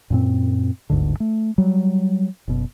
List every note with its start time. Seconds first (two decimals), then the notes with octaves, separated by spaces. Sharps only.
0.10 F#2 A#2 C4
0.90 G1 D2 G#2 D3
1.20 A3
1.58 F#3 G3
2.48 F#1 B2